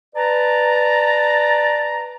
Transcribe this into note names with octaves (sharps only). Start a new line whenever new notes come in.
B4 D5 A5 A#5